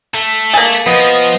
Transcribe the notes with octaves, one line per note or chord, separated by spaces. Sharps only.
A4 E5
A#3 G#4 A6
F3 B3 D#5